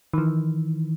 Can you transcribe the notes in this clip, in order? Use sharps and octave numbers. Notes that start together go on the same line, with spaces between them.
D#3 E3